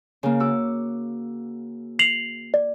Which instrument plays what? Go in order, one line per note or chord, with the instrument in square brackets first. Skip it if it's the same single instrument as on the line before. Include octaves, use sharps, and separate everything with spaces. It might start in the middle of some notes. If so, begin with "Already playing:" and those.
[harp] C#3 A#3
F#4 D6 E6
[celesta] C7 F7 F#7
D5